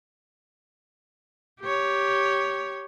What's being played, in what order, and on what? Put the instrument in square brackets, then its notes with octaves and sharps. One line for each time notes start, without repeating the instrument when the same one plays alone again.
[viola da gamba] G4 C#5